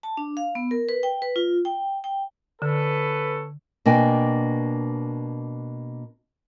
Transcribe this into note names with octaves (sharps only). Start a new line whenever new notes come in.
A5
D4
F5
B3
A#4
B4
G5
B4
F4
G5
G5
D3 C#4 A4 B4
B2 A#3 D4 G5 G#5